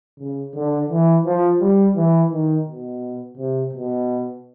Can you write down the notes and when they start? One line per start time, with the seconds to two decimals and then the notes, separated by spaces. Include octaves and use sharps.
0.19 C#3
0.55 D3
0.90 E3
1.25 F3
1.60 G3
1.96 E3
2.31 D#3
2.67 B2
3.37 C3
3.73 B2